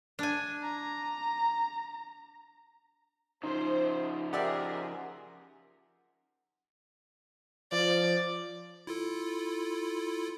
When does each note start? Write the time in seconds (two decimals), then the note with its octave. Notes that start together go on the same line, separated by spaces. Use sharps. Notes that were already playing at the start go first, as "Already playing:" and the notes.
0.19 D4 G#5
0.64 A#5
3.43 C#3 F3 D#4 C5
4.33 G4 G#4 A#4 D5 E5 F#5
7.72 F3 D5
8.87 E4 F4 A4